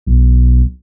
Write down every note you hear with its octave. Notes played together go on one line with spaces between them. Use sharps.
B1